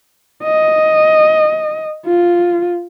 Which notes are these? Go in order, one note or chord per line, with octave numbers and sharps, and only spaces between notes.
D#5
F4